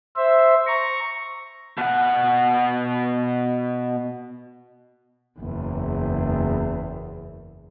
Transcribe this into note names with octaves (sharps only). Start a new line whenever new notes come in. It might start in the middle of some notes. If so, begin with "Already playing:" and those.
C5 E5
A#5 C#6
B2 F#5
F#1 E2